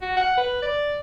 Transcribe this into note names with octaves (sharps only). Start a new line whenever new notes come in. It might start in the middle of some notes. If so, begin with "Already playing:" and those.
F#4
F#5
B4
D5